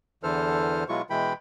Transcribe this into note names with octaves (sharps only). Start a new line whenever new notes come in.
E2 D3 E3 A4 C5 F6
B2 F#3 G#3 E4 F4 C#6
B2 E3 G#3 E4 G5 B5